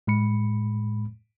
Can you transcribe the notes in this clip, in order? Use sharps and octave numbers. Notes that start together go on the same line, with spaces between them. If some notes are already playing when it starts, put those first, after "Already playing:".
A2 G#3 B5 C#7